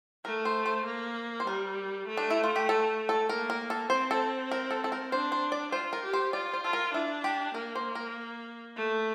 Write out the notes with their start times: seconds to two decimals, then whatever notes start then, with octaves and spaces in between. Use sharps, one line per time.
0.25 A3 A#4
0.45 C5
0.66 C5
0.86 A#3
1.40 C5
1.47 G3 A#4
2.08 A3
2.17 D4
2.30 E4
2.44 F4
2.56 G4
2.69 A4
3.09 A4
3.29 A#3 A#4
3.50 A#4
3.70 A4
3.90 C4 C5
4.11 A4
4.51 A#4
4.71 A4
4.84 A4
4.92 A#4
5.12 D4 C5
5.32 C5
5.52 D5
5.72 F4 C5
5.93 A#4
6.03 G4
6.13 C5
6.33 F4 D5
6.53 C5
6.63 F4 A4
6.73 A#4
6.94 D4 E4
7.24 G4
7.55 A#3 A#4
7.75 C5
7.95 A#4
8.76 A3